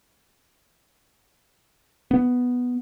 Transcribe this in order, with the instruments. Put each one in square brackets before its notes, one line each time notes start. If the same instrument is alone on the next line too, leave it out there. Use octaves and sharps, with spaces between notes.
[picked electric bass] B3